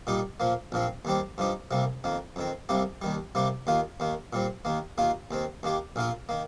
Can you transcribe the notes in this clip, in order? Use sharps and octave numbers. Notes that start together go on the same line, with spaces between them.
A#2 G3 D#4 G4
A#2 F3 A#3
A#1 A#2 F3 C4
D#2 D#3 G3 C4 G4
G2 F3 D#4 G4
C2 C3 G3 A#3
F2 D#3 A#3
F2 D#3 C4
C2 C3 G3 A#3 G4
D#2 D#3 G3
C3 G3 A#3 G4
D#2 D#3 A#3 F4
D#2 D#3 A#3
A#2 G3 C4
D#2 D#3 A#3
D#2 D#3 A#3 F4
D#2 D#3 C4
D#2 D#3 A#3 G4
A#1 A#2 A#3 F4
D#3 A#3